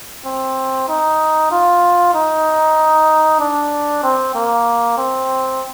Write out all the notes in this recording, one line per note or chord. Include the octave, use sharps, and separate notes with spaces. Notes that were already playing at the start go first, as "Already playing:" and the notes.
C4
D#4
F4
D#4
D4
C4
A#3
C4